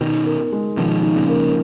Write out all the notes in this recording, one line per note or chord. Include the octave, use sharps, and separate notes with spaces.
B2 D#3 D#4
A#4
G#3
B2 D#3 F3
D#4
A#2 C#3
A#4